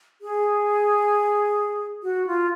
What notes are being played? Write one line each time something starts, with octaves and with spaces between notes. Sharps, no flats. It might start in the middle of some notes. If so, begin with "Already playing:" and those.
G#4
F#4
F4